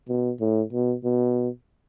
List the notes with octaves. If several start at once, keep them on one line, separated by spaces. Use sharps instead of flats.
B2
A2
B2
B2